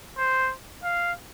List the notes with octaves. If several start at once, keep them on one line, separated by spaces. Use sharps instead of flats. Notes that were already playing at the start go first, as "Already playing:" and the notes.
C5
F5